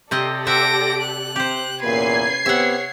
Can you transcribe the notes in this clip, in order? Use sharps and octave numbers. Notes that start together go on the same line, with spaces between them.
C3 C4 G4 A4 D5 D#5
C4 E5 F#5 A#6 D7
F#6
C3 G4 C5
E2 A#2 A#3 C#4 B4 G#6 C7
B3 C4 G4 C#5 E5 F#5